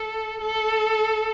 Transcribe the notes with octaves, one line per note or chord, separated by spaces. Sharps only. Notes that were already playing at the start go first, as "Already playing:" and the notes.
Already playing: A4
A4